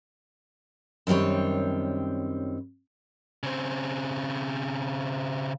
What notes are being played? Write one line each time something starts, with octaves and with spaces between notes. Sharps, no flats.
F#2 D#3 G3 C4 C#5
C#3 C4